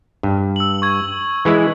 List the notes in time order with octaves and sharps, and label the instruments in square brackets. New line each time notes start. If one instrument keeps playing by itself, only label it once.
[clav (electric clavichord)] G2
[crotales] E6 F#7
C#6 G#6
[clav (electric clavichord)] E3 G#3 E4